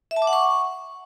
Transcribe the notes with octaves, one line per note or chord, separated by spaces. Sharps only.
E5
A5
D6
F#5
C#6